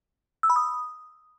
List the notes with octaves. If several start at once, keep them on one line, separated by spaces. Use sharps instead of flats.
E6
B5
D#6